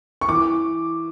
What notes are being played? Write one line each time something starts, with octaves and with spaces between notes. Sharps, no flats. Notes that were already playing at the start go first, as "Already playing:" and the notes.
C#6
E3 D6